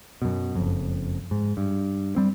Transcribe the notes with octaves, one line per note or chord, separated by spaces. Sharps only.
F#2 B2
F#1 F2
G#2
G2
G3 C4